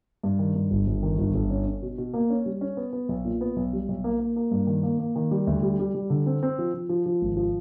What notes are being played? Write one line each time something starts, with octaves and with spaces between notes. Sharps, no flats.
G2
D#3
G2
G1
G1
D#3
G1
G1
C#4
C#4
B2
B2
A#3
C#4
G3
C#4
B3
B3
B1
A#2
B3
B1
G3
B1
A#3
A#3
A#3
G2
D#3
A#3
A#3
D#3
G3
D2
G3
G3
G3
D3
C4
C4
F3
F3
F3
F3
G#1
F3